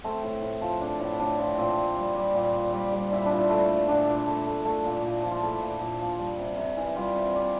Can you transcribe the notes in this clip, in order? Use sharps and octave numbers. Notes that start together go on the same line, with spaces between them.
A3 C4
A2
A2
F3
A3 D4
A2 E4
A2 D4
F3 C4
A#2 C4
A#2
G3
G3
A#2
A#2
G3
G3
A#2 E4
A#2 D4
E4
A3
A3
A#2 D4
A#2
A3
A3
A3
A#2
A#2
F3
F4
A3 E4
A#2
A#2
F3
G3
C3
C3
E3
G3 F4
C3
C3 D5